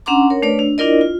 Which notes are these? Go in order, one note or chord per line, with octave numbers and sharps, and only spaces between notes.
C#4 D4 F#5 A#5 C6 D6
A#4 C#5
A3 D4 B4 C#5 D5
D4
D4 E4 F4 A#4 D5 D#5
F4